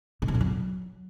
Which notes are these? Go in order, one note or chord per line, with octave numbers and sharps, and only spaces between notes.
B2
C3
F2
F#3